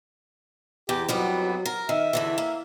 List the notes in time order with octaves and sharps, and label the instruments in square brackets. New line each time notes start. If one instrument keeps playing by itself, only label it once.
[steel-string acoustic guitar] E2 [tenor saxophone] G4
[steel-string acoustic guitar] F2 G3 B3 [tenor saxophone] F#3
[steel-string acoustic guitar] A#4
[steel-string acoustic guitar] D#3 [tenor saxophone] E5
[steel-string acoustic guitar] E2 D3 E3
A#3